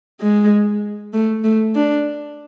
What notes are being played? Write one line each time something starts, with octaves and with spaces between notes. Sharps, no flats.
G#3
A3
A3
D4